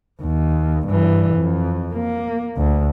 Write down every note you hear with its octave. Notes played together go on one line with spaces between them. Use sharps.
D#2
G2 E3
F2
A#3
D2